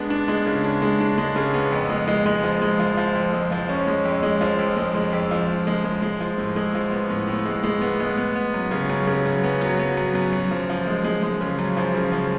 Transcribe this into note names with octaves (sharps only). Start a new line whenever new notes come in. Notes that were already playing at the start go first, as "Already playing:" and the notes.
Already playing: G#3 B3 D4
D4
G#3
C#3
D4
G#3
D4
G#3
C#3
B3
F2
G#3
G#3
G#3
F3
G#3
F3
F3
F2
G#3
F3
C#4
G#3
F2
G#3
F3
F2
G#3
G#3
F2
F3
F2
G#3
G#3
G#3
F3
A2
G#3
F3
B3
A2
A2
G#3
G#3
B3
G#3
B3
B3
F#2
C#3
F#2
C#3
F#2
B3
F#3
B3
F#2
F#2
F#2
F3
F3
G#3
G#3
G#3
C#3
F#2
F3
C#3
F3